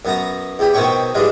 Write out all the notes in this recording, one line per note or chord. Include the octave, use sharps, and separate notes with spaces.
F#2 B3 A#5
E2 G4 B5
B2 D#3 C4 C#5 G5 C#6
G#2 E3 G3 G#3